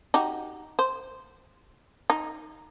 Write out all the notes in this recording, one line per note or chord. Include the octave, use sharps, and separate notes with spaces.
D#4 F#4 G4
C5
D#4